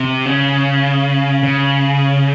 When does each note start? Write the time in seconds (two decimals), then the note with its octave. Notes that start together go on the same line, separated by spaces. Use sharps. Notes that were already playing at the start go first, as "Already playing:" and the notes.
Already playing: C3
0.26 C#3
1.43 C#3